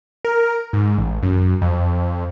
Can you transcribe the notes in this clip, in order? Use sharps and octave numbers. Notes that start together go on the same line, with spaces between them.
A#4
G#2
A1
F#2
F2